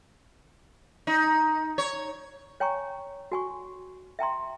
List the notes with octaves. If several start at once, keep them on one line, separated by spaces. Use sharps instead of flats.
D#4
C#5
C#5 G5 G#5 A#5 C#6
F#4 G#5 C#6
E5 G5 A#5 C6